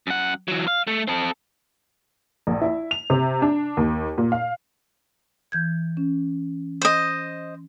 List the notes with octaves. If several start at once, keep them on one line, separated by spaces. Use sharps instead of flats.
F#2 F#5
E3 F#3
F5
A3
C4 A4
A#1
E4
F7
C3
D4
D#2
A#2
F5
E3 G6 G#6
C#4
C5 D#5